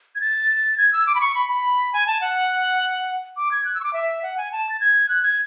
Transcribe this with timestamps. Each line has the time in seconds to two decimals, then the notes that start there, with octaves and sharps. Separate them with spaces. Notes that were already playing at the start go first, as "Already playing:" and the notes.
0.15 G#6
0.21 A6
0.78 G#6
0.93 E6
1.07 D6
1.15 B5
1.21 C#6
1.35 B5
1.49 B5
1.93 G#5
2.07 A5
2.21 F#5
3.37 D6
3.51 G#6
3.65 F#6
3.75 E6
3.81 C#6
3.84 D6
3.93 E5
4.23 F#5
4.38 G#5
4.52 A5
4.69 A6
4.81 G#6
5.09 F#6
5.23 G#6